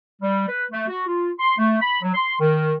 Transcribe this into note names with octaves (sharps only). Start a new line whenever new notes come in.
G3
B4
A3
F#4
F4
C6
A3
B5
F#3
C6
D#3